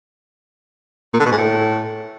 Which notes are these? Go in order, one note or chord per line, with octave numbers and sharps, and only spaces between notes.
A#2
D3
B2
G#2
A2